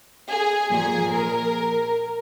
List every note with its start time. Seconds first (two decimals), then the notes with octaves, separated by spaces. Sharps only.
0.28 G#4
0.70 A#2 F3 G#4
1.12 A#4